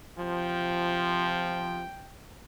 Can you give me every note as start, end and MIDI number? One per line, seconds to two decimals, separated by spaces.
0.18 1.85 48
0.18 1.85 53
0.18 2.20 79